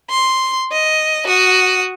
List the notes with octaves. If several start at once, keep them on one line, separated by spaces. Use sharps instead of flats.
C6
D#5
F#4 D#6